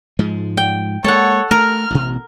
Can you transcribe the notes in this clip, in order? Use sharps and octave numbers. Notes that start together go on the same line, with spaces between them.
G#2 F3 G#3
G5
G#3 A#3 A4 C#5 F#5
A3 A#4 F6
A1 B2